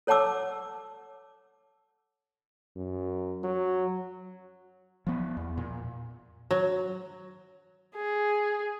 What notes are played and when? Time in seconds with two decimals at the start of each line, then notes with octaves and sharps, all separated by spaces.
0.07 A4 C#5 F#5 A5 D6 E6
2.76 F#2
3.43 F#3
5.07 F3 B3
5.37 E2
5.58 A#2
6.51 F#3
7.96 G#4